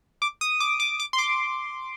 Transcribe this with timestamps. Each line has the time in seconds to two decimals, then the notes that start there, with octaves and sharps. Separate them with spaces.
0.22 D6
0.41 D#6
0.60 D6
0.80 D6
1.00 D6
1.13 C6
1.18 D6